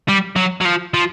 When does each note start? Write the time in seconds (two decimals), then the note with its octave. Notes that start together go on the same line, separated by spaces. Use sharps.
0.08 G3
0.36 F#3
0.61 F#3
0.65 F3
0.94 F3